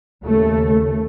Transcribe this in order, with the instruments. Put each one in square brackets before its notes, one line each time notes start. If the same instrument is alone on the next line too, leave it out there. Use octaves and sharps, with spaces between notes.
[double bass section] D#2 C#3 A3